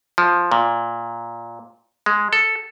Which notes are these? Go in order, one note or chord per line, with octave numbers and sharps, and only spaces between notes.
F3
A#2
G#3
A4